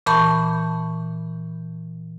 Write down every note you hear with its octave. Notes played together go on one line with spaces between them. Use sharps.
A#2 E3 A5 B5 C#6 G6